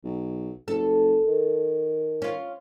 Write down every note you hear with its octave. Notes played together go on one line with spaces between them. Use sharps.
B1
F#1 A4
D#3
C#4 F4